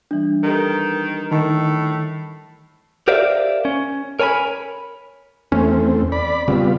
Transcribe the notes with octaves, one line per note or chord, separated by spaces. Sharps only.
E3 G3 D4
D#3 G4 A4 B4
A2 D#3
G4 A#4 C5 D5 E5 F5
C#4
A#4 C#5 G#5 A5 B5
E2 A3 C4 C#4
D5 B5
C#3 G3 B3 C4 F4